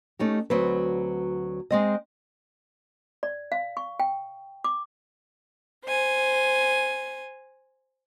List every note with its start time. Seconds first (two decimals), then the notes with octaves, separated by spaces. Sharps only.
0.19 A3 C#4 D#4 G4
0.50 D2 F#3 C4 B4
1.71 G#3 C4 D#5
3.23 D5
3.52 F5
3.77 C#6
4.00 G5
4.64 D6
5.86 C5 G#5